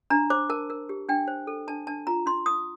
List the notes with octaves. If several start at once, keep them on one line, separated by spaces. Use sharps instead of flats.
D4 A#5
C5 D6
A#4 A5
A#4
G4
D4 G5
C5
A4
D4 A5
D4 A5
F4 A#5
D#4 C6
D#4 D#6